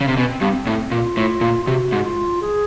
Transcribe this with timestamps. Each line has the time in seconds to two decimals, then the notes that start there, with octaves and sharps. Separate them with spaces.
0.01 C#3
0.08 C3
0.16 B2 C#4
0.28 C4
0.40 G2 B3
0.51 C4
0.67 A2
0.91 A#2 F4
1.17 A2
1.41 A#2
1.62 F4
1.67 C3 F#4
1.92 G#2
2.04 F4
2.42 G#4